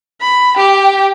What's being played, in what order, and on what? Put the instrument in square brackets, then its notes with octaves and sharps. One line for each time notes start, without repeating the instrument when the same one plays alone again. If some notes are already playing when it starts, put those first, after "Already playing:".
[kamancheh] B5
G4 G5